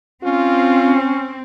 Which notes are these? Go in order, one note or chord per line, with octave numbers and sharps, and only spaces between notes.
C4 C#4 F4